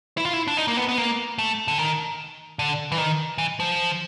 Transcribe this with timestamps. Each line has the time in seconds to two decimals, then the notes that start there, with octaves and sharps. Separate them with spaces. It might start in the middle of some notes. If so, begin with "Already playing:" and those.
0.17 E4
0.25 F4
0.33 E4
0.48 D4
0.57 D#4
0.68 A#3
0.77 B3
0.88 B3
0.98 A#3
1.38 A3
1.68 D3
1.78 D#3
2.59 D3
2.92 E3
2.98 D#3
3.38 E3
3.60 F3